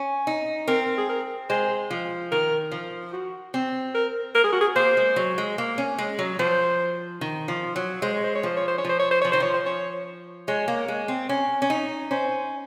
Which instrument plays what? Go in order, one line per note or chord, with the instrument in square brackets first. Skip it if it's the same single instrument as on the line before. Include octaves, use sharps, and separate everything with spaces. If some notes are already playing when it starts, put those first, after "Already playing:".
Already playing: [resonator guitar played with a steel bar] C#4
D#4
[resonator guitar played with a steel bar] C4 [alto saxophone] A#4
[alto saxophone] G#4
A#4
[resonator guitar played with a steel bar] G#3 [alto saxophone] C5
[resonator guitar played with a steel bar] F3
[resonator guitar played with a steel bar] D#3 [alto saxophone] A#4
[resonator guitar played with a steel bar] F3
[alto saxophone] F#4
[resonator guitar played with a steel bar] C4
[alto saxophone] A#4
A#4
G#4
F#4
G#4
[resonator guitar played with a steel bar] A#3 [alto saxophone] C5
[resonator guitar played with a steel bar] G#3
F#3
G#3
A#3
C#4
G#3
F#3
[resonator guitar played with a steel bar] F3 [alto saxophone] C5
[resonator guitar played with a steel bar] D#3
F3
F#3
[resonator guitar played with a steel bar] G#3 [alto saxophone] C5
[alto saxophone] C#5
C5
C#5
[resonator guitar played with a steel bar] F3 [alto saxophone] C5
[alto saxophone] C#5
C5
C#5
[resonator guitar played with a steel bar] F3 [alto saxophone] C5
[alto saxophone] C#5
C5
[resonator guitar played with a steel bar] F3 [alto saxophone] C#5
[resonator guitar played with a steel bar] D#3 [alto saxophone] C5
[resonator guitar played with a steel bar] F3 [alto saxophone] C#5
[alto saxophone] C5
C#5
[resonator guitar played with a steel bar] G#3 [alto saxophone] C#5
[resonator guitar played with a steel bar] A#3
G#3
C4
C#4
C#4
D#4
[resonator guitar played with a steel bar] C#4 [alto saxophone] C5